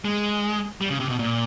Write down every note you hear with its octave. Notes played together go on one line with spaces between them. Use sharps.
G#3
G3
C#3
C3
B2
A#2